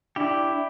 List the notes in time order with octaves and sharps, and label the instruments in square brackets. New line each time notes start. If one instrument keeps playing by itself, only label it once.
[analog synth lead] D4 [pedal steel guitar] E4 G4